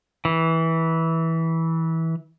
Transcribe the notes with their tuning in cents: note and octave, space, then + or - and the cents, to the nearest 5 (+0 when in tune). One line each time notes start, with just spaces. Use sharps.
E3 -15